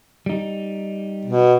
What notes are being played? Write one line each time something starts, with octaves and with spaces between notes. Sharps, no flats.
G3 D#4
B2